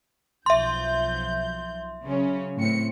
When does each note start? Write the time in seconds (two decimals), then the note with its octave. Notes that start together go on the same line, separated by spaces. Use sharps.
0.46 B1 F3 E5 C6 G6
2.04 C#3 F#3 C#4
2.57 A2 C4 C#7